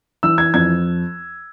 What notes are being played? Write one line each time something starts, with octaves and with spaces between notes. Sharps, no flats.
E3 E6
G#6
F2 G#6